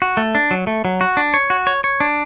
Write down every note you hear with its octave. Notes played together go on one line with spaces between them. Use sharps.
F#4
A3
D4
F#3
A3
F#3
F#4
D4
C#5
F#4
C#5
C#5
D4